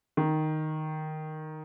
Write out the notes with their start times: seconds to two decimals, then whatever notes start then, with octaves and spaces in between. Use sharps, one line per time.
0.17 D#3